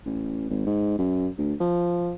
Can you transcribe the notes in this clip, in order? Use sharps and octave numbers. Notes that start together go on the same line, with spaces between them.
A1
G#1
G#2
F#2
D2
F3